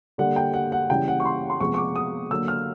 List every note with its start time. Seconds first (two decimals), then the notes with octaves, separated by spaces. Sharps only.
0.18 D3 G3 A#3 F#5
0.36 G5
0.54 F#5
0.72 F#5
0.89 C#3 E3 G3 G5
1.08 F#5
1.20 C#6
1.25 C6
1.50 C6
1.60 C3 F3 G#3 B3 C#6
1.74 C#6
1.78 D6
1.96 D#6
2.31 D3 F#3 A#3 E6
2.48 F6